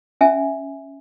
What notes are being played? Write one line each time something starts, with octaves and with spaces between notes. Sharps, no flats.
C#4 E5 G#5